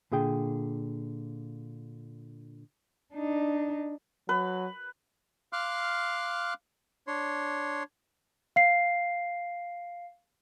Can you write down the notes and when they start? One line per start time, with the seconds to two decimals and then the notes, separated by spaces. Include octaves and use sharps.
0.12 A#2 D3 G#4 G5
3.14 D4 D#4
4.29 F#3 B4
5.53 F5 C6 D6 F6 F#6
7.07 D4 C#5 C6
8.56 F5 C7